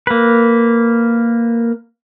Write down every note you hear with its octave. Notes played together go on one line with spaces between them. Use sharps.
A#3 B4